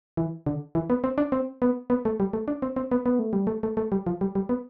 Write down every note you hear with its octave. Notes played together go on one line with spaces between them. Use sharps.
E3
D3
E3
B3
C4
D4
C4
B3
B3
A3
G3
A3
D4
C4
C4
B3
B3
A3
G3
A3
A3
A3
G3
F3
G3
G3
B3